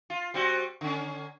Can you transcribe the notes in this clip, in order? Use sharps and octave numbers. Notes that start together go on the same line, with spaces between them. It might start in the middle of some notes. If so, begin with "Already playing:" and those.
F4
G3 C4 F#4
D3 C#4